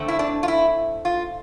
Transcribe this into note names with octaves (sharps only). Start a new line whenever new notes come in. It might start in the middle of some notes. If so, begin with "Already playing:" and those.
Already playing: D3 A3 C4
E4
D4
F4
E4
F4